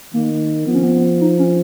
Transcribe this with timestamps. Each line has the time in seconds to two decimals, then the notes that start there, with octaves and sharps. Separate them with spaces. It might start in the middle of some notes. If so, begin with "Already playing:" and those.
0.14 D#3 A#3
0.67 F3 B3
0.75 C#4
0.84 B3
0.94 B3
1.21 D#4
1.39 C#4